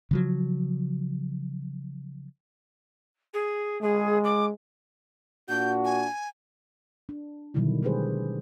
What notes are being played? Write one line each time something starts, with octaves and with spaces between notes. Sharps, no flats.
C#3 F3 F#3
G#4
G#3 G#4
D6
A#2 D4 F#4 G6
G#5
D4
B2 D3 D#3 F#3 G3 E4
G#3 D4 G4 G#4 B4 C5